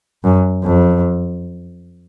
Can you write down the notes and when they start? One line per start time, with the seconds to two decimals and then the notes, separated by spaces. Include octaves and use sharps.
0.24 F#2
0.64 F2